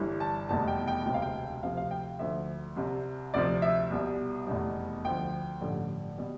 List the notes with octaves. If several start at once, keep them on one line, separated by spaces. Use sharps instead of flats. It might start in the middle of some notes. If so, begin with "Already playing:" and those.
Already playing: G1 G2 E3 G3
A5
F1 E2 B2 G3 A5
G5
G5
E1 D2 C3 G5
F5
G5
D2 C3 F3 F5
F5
G5
D2 D3 F3 E5
C2 C3 G3
D2 C3 F3 D5
E5
C2 B2 G3
F1 E2 B2 G3
D2 D3 F3 G5
A1 G2 D3 F3
B2 G3